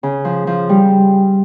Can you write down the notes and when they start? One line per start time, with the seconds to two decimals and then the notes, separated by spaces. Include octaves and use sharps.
0.03 C#3
0.25 F3
0.47 F3
0.69 G3